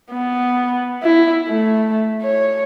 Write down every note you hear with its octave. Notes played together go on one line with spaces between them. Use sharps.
B3
E4
A3
C#5